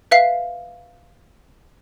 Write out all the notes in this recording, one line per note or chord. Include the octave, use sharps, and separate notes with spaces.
B4 E5 F5 C7